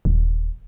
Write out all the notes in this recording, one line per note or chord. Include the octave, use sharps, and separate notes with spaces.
D#1